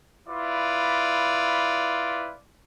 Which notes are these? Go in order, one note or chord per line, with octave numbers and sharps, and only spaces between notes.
E4 F4 B4 D5